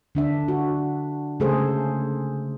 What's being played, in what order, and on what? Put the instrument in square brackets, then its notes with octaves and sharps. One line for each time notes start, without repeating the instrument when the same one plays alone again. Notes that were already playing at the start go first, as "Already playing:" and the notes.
[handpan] D3 D4 E5
F#4
C#3 A3 G#4 A4 C5